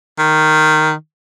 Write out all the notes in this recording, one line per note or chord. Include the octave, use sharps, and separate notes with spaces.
D#3